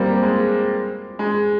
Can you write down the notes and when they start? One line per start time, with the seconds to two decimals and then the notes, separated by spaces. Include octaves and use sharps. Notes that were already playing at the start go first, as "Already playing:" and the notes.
Already playing: G3 A#3 C4
0.23 G#3
1.19 G#3